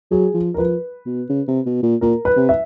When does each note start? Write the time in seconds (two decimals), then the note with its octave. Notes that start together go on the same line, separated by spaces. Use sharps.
0.11 F#3 G#4
0.34 F3
0.54 A#4
0.58 F3 B4
1.06 B2
1.29 C#3
1.48 C3
1.66 B2
1.83 A#2
2.01 A#2 A#4
2.25 B4
2.36 C3
2.49 E5